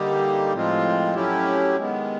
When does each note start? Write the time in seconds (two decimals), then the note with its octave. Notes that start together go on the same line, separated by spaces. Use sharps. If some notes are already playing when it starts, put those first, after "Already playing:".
Already playing: D3 G3 A#3 D#4 G4
0.53 A2 F3 G#3 C4 F4
1.14 F#3 A3 C#4 E4 G4
1.77 D#3 G#3 B3